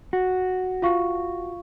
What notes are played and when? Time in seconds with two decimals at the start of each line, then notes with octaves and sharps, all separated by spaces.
0.13 F#4
0.82 F4 F5 C#6